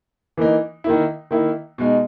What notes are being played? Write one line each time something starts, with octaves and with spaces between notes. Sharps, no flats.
E3 A#3 D#4
D#3 A#3 E4
D#3 A#3 E4
B2 G#3 D#4